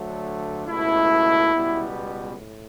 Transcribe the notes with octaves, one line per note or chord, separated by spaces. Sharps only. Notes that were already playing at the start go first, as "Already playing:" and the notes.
Already playing: D2 D3 F#3 A3
C#2 B2 A3 E4
C#2 B2 G3 B3
A2